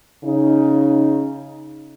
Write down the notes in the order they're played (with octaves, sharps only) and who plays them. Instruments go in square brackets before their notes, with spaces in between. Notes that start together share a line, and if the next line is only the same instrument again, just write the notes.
[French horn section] C#3 D#4